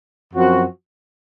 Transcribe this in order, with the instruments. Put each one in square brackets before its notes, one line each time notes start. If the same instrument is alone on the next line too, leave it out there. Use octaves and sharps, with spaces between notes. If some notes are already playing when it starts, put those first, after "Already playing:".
[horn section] F#2 F3 C4 F#4